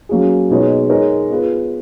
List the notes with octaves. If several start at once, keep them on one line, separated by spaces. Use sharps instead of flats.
F#3 A#3 C#4 G#4
B2 G#3 D#4 G#4 C#5
G#3 D#4 A#4 C#5
B3 F4 G#4 B4